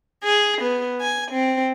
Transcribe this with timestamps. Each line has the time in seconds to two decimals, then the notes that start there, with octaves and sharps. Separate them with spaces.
0.24 G#4
0.62 B3
1.01 G#5
1.32 C4